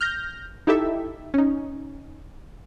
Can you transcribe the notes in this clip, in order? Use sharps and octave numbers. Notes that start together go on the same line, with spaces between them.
F6 G6 A#6
D#4 E4 G4 A4 E5
C#4 D#4